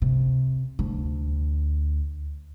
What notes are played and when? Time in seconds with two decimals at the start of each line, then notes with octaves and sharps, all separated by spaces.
0.02 C3
0.79 D2